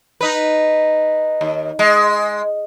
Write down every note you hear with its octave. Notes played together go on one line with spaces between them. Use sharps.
D#4 B4
D#2
G#3